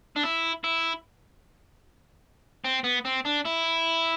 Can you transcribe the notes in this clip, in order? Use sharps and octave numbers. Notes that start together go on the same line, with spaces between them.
D4
E4
E4
C4
B3
C4
D4
E4